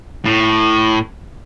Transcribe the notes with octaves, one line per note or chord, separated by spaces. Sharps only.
A2